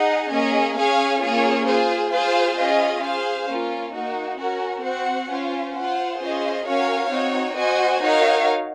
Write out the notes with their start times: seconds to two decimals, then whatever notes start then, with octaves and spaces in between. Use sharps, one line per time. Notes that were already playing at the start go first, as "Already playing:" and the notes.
Already playing: D#4 G#4 D#5 F#5
0.30 A#3 C#4 G#4 D#5
0.76 C#4 G#4 C#5 F5 G#5
1.21 A#3 C#4 F4 G#4 C#5
1.67 F4 G#4 C5
2.12 F4 G#4 C5 F5
2.57 C#4 F4 G#4 D#5
3.03 G#4 C5 F5
3.48 A#3 C#4 F4
3.93 A#3 D#4 F#4
4.38 C#4 F#4 A#4
4.83 C4 F#4 C5 F#5
5.29 C#4 F4 C5
5.74 F4 C5 F#5
6.20 C#4 F4 G#4 C5 D#5
6.65 C#4 F#4 A#4 C#5 F5
7.10 C4 D#4 F#4 C#5
7.55 F#4 C5 D#5 G#5
8.01 D#4 F#4 A#4 C#5 F5